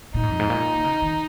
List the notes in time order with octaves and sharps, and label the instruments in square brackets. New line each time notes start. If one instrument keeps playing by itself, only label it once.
[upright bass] A#2 [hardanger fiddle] D#4
[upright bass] G#2
F2
G#2
A#2
D#3
C#3
D#3